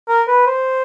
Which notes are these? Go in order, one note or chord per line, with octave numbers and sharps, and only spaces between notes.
A#4
B4
C5